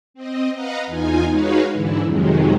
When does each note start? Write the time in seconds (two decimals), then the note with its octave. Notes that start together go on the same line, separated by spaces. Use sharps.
0.14 C4 D#5
0.54 B4 D#5 F5 F#5 A#5
0.87 E2 D#4 F4 G#5
1.29 G#3 D#4 F#4 B4 C#5 F5
1.73 G#2 D3 E3 E4
2.03 F2 C3 D#3 F#3 G#3